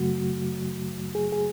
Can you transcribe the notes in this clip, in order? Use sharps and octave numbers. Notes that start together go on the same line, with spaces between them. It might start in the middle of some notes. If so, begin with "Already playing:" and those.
Already playing: F#2 C#3 F#3 A3 F#4
G#4
G#4